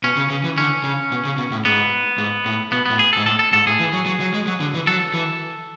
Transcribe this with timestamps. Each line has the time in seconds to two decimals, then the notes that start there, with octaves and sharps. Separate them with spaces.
0.04 B2 C#4
0.17 C#3
0.30 C#3
0.44 E3
0.58 D3 C#4
0.84 C#3
1.12 B2
1.25 C#3
1.38 B2
1.52 A2
1.65 G#2 B3
2.18 G#2
2.46 A2
2.72 B2 B3
2.86 A2 B3
2.99 G#4
3.13 G#2 A4
3.26 A2 A4
3.39 A4
3.52 G#2 A4
3.67 A2 G#4
3.80 E3
3.93 F#3
4.06 F#3
4.20 F#3
4.34 G#3
4.47 F#3
4.60 D3
4.74 E3
4.87 F#3 A4
5.14 E3